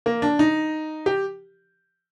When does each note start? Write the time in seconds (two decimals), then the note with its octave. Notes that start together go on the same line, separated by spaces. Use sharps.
0.06 A#3
0.22 D4
0.39 D#4
1.06 G4